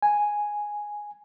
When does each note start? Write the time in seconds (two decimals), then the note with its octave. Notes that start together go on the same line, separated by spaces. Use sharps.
0.02 G#5